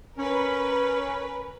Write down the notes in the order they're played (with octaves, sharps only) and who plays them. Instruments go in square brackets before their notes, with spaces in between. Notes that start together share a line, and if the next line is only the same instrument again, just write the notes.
[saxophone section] C#4 [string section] A#4 B4